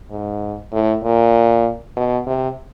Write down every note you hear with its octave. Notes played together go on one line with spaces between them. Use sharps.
G#2
A2
A#2
B2
C3